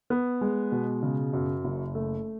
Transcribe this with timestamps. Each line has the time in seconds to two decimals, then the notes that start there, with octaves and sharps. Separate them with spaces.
0.10 B3
0.41 G#3
0.72 B2
1.03 C#3
1.33 F#2
1.65 F#1
1.95 A3